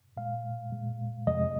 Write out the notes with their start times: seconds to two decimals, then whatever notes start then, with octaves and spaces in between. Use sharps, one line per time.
0.17 A#2 G#3 F5
0.72 A#2 G#3
1.27 F2 C3 F3 G#3 D#5